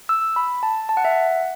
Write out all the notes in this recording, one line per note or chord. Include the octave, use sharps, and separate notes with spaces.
E6
B5
A5
A5
F#5
E5
F#5